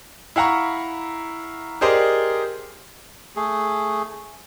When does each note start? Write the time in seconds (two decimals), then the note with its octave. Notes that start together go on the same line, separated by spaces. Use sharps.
0.36 E4 F5 F#5 A#5 C#6
1.81 G4 G#4 A#4 C5 D5 D#5
3.36 A3 G#4